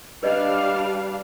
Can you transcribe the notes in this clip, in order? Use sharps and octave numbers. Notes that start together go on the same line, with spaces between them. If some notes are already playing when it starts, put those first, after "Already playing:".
G3 D4 B4 D5 D#5 F5